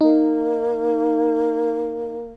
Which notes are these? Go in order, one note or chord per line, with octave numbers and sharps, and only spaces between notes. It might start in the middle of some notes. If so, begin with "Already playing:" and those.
A#3 D#4